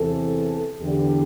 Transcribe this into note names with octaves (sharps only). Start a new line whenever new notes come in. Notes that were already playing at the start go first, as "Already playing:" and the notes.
Already playing: E2 C3 E3 A4
E2 D3 G4